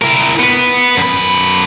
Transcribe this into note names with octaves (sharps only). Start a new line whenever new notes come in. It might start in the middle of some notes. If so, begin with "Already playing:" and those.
E4 A#4
B3 B4
F#2 B5